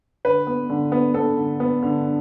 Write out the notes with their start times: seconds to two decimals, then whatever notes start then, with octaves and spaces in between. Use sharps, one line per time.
0.25 D3 B4
0.47 B3
0.70 D3
0.92 B3
1.14 B3 A4
1.37 D3
1.60 B3
1.83 D3